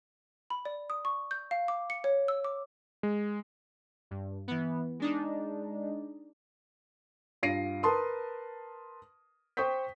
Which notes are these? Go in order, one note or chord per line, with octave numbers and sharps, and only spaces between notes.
B5
D5
D#6
C#6
G6
F5
D6
C#7
C#5
E6
D6
G#3
G2
E3 B3
G#3 D4 D#4
G2 F4 A#6 C7 D7 D#7
A#4 B4 A5 C6 D#6
C5 G5 C#6 D#6 G6 B6